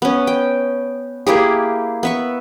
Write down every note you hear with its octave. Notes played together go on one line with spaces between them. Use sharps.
B3 C#4
G5
A#3 E4 G4 G#4
B3 E5 C#6